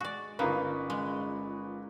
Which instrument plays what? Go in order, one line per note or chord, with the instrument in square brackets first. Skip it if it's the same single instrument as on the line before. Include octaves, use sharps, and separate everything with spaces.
[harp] G#3 [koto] F#4 D5
[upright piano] G1 A#4 B4 [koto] A#3 [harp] C#4 D#4 F4
[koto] G#3